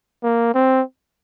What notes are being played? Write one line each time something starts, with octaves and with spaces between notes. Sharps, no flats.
A#3
C4